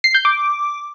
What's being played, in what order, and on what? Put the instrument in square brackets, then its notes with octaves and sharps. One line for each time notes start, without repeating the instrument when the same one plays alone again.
[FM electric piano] C7
G6
D6